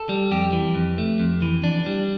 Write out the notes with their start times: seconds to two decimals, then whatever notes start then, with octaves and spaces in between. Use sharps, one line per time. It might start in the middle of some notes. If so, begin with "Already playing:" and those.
Already playing: A4
0.09 G3
0.31 F2 G4
0.53 E3
0.75 F2
0.98 A3
1.20 F2
1.42 E3
1.64 D4
1.86 G3